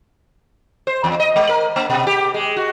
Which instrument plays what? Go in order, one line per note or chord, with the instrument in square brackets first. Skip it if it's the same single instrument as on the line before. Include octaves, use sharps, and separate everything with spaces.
[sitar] C5
E2
D#5
G#3
A#4
A#3
B2
G4
G#3
F#4